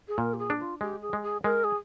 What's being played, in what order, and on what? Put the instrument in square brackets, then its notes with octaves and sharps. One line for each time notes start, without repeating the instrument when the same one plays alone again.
[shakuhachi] G#4
[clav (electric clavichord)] A#2 [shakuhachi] A#4
[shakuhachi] G4
G#4
[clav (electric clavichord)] D4
[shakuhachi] F4
[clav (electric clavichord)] G#3 [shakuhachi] G4
[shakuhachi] G#4
[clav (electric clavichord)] G#3
[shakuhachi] G#4
[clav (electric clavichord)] G#3 [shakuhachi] A#4
[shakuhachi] G#4